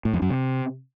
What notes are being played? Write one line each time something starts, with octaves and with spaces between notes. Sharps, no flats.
A2
F2
F#2
C3